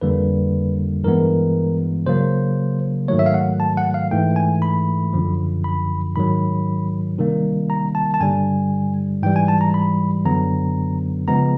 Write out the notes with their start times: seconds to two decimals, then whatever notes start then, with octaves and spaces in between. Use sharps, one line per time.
0.01 F2 D3 G3 A#3 B4
1.04 G2 E3 G#3 B3 A#4
2.06 C#3 F#3 A#3 C5
3.08 G#2 D#3 F#3 A3 C#5
3.19 E5
3.26 F5
3.34 F#5
3.60 A5
3.77 F#5
3.94 F5
4.11 G#2 E3 A3 G5
4.36 G#5
4.62 B5
5.13 F#2 D3 F3
5.64 B5
6.16 G#2 D#3 F#3 B5
7.18 C3 D#3 G3 A#3
7.70 A#5
7.95 A5
8.14 A5
8.20 G2 D3 G3 G#5
9.23 G#2 E3 G3 G5
9.36 G#5
9.48 A5
9.61 A#5
9.74 B5
10.25 F#2 D3 F#3 B3 A#5
11.28 C#3 F3 G#3 B3 A#5